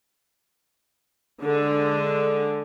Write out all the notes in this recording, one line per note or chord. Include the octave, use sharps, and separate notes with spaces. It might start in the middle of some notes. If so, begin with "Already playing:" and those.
D3 G#3